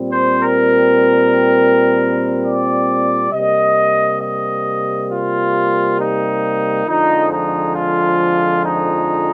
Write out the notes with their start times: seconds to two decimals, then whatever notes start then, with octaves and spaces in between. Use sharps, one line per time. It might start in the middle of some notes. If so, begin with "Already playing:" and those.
Already playing: A#2 G3 C4
0.09 C5
0.39 A#4
2.44 D5
3.33 C3 G3 A#3 D#5
4.21 D#5
5.10 F4
5.98 D#4
6.86 F2 D3 F3 G#3 D#4
7.29 D#4
7.74 F4
8.62 D#4